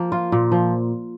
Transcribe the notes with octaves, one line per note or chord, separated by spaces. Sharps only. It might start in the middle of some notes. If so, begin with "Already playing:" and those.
Already playing: F3 A#3
F4
A#2
F3